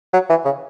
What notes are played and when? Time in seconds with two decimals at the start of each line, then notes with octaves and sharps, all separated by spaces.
0.13 F#3
0.30 E3
0.45 C#3